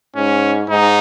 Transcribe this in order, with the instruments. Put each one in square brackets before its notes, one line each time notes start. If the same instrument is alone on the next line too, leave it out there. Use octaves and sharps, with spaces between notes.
[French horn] G#2 [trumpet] C#4
[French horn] G#2 [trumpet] D#4